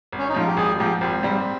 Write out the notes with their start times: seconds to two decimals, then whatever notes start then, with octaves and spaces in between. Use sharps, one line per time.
0.12 G#1
0.19 C#4
0.29 D#4
0.34 G#2 F3 F4
0.47 G4
0.57 G#1 G#4
0.79 G#2 F3 G4
1.01 G#1 C4
1.23 G#2 G3